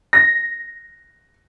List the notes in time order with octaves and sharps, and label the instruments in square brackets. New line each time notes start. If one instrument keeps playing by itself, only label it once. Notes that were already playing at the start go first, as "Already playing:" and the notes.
[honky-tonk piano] A#6